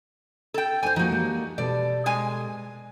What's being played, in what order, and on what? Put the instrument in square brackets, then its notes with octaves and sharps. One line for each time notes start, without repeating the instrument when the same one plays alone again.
[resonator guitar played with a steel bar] A4 G5
[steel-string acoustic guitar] D#4 D5 [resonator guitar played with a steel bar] C5 G#5
[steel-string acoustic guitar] F3 A#3 [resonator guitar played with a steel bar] D#4 F#4
[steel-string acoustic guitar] G3 A#3
[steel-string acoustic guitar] B2 G3 A4 [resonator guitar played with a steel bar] D5
[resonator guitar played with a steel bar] G#3 G#5